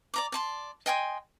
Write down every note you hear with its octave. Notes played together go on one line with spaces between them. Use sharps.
D5 A#5 D6
D5 A5 C6
D#5 G5 G#5 C6